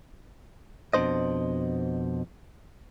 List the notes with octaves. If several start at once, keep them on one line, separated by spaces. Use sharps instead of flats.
F2 B2 A#3 D4 C5 D#5